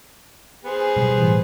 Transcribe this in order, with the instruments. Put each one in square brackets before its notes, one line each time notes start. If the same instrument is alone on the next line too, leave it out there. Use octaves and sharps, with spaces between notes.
[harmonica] B3 G#4 C5
[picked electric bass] B2 F#3 G3
[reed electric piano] A2 E3